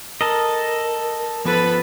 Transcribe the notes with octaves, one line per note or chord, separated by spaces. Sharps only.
A4 A#4 D#5
F3 B3 A4 B4 B5